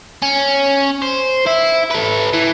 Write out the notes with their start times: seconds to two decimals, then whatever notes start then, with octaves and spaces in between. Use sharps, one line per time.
0.22 C#4
1.02 C5
1.47 E4
1.91 A4 B4
2.33 E3